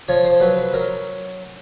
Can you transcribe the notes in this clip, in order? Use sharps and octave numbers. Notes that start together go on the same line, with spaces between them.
F3 C#5
C5
F#3 B4
B4
F#3 A#4